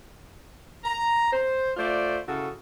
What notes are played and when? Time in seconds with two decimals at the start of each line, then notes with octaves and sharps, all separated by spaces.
0.84 A#5
1.32 C5
1.77 A3 F4 C5 D5
2.28 C#3 E4 F#4 A4